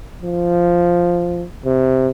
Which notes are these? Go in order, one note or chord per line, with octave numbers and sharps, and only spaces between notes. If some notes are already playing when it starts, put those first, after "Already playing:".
F3
C3